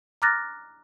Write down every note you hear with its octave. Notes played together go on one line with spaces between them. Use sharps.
A#5 D6 F6 F#6 A6 A#6